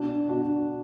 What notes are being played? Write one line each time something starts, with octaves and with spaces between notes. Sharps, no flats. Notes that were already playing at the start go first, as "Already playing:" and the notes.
Already playing: B2 D4 F#4
B2 D4 F#4